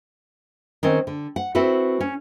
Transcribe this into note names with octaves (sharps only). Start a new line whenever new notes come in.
D#3 C4 C#4
D3
F#5
C4 E4 F#4 A4 B4
C#4